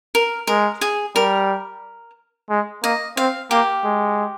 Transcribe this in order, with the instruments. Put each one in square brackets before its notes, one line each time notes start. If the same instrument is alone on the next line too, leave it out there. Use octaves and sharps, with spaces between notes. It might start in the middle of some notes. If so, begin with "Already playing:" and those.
[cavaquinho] A#4
[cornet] G#3 [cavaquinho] A#4
[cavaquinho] G#4
[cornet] G3 [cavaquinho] A#4
[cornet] G#3
[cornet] A#3 [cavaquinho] D#5
[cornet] C4 [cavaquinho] F5
[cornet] A#3 [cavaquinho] G4
[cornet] G#3